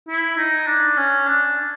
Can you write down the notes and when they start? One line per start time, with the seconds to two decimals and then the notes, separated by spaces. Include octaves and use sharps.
0.09 E4
0.37 D#4
0.67 D4
0.97 C#4
1.27 D4